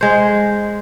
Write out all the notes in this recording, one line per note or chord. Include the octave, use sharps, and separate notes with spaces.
G#3 C5